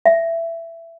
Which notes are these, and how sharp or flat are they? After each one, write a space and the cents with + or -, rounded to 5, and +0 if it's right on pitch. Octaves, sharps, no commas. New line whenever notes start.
E5 +15